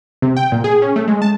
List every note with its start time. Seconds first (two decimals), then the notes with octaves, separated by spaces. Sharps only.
0.22 C3
0.37 G5
0.52 A#2
0.64 G#4
0.82 C#4
0.96 A3
1.08 G#3
1.22 A5